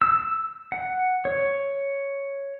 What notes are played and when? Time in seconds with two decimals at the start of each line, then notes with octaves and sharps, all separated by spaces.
0.02 E6
0.72 F#5
1.25 C#5